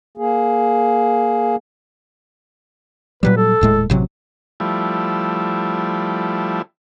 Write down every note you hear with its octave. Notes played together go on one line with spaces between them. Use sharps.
A#3 G#4
A#2 F#3 G3 B4
A4
D#1 A2 G#3
A1 C3 F#3
F3 G3 A3 E4